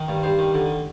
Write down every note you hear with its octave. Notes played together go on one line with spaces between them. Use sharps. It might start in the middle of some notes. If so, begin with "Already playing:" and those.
Already playing: D#3
G2
G2 C5
D#3
D3